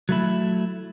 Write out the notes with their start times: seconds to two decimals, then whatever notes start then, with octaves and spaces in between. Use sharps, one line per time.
0.09 F#3 A3 E4